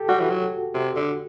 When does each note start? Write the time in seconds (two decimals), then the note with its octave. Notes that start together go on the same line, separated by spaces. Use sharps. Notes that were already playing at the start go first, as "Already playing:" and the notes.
Already playing: G4 A4
0.09 G3 F#4
0.20 E3
0.30 F#3
0.75 C3
0.96 D3